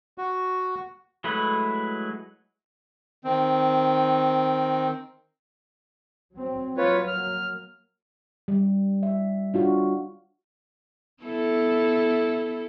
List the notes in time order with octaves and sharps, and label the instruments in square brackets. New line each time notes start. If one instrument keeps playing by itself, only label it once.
[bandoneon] F#4
[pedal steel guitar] F#3 G#3 A3 E4 B4
[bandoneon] D#3 C4
[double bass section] F#3 C4
[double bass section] F#3 A#3 [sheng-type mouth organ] F4 B4 C#5
[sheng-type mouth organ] F6
[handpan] G3
E5
D4 F4 F#4
[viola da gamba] B3 E4 A4